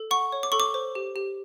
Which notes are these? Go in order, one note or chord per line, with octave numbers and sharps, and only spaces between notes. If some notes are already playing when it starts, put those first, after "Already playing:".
Already playing: A4
F#5 C#6
C#5
D6
A4 C#6
D6
C5
G4
G4